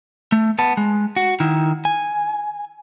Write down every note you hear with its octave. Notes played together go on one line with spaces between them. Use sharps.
A3
B3 A5
G#3
F#4
D#3 E4
G#5